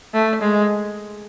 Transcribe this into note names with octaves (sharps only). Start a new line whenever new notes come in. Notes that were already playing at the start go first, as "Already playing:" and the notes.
A3
G#3